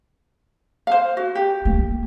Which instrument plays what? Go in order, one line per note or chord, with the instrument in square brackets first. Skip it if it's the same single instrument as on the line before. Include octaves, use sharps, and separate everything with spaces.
[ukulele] C5 F5
F#4
G4
[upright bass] A#3